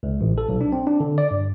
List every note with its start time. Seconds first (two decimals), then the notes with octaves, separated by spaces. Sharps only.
0.03 C#2
0.21 A1
0.38 A4
0.49 B1
0.61 D4
0.72 C4
0.87 D4
1.00 D3
1.18 D5
1.31 G2